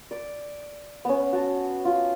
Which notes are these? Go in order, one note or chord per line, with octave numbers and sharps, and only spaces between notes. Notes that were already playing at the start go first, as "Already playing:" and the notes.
D5
B3 C#4
F#4 A5
F4